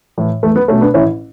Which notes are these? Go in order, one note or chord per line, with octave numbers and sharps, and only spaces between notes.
A2 E3
E2 A3
B3
B2 A3 C#4
B3 D4
A1 C#4 E4